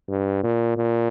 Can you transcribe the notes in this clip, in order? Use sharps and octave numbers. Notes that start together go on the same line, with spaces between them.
G2
A#2
A#2